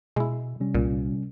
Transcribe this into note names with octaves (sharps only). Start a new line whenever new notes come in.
B2 G#3 E4
C3 G3 C#4
C2 A#2